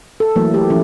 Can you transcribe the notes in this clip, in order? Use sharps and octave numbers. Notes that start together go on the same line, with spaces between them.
A4
E3 F#3 A3 A#3 E4
A3 G4
E3 F3 C#4 E4